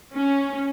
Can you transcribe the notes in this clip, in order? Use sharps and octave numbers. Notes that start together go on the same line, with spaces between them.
C#4